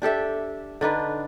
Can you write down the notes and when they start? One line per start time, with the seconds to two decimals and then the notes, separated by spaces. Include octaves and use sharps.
0.02 D4 G4 A4 E5
0.81 D3 D4 D#4 B4